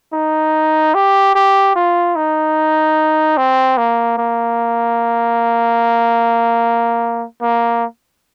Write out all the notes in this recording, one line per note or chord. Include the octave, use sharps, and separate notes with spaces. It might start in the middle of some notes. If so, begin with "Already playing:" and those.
D#4
G4
G4
F4
D#4
C4
A#3
A#3
A#3